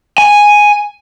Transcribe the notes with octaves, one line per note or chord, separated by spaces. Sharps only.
G#5